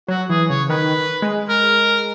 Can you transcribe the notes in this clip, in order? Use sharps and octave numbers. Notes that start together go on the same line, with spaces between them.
F#3 F#4
E3 G#4
C#3 C#5
D#3 B4
G#3
A#4